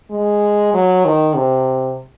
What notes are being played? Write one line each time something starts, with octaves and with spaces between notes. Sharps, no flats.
G#3
F#3
D#3
C3